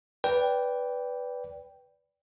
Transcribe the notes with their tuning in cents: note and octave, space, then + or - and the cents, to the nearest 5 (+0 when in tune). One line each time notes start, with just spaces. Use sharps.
B4 +0 D5 -20 G5 +0